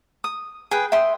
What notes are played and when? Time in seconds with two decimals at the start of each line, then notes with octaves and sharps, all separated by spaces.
0.24 D#6
0.71 G#4 B4 G5
0.92 E5 G5 C6 D#6